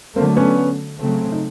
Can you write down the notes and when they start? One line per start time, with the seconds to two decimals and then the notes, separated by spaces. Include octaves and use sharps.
0.16 D3 F#3 A3 A#3 C4
0.36 B3 C#4
0.99 C#3 F#3 A3 C4
1.32 D#4